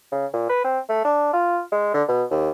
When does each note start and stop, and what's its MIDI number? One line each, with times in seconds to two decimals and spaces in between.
0.12 0.26 49
0.33 0.49 46
0.49 0.64 71
0.64 0.79 60
0.89 1.04 57
1.05 1.30 62
1.33 1.60 65
1.72 1.90 56
1.94 2.03 50
2.08 2.24 47
2.31 2.51 39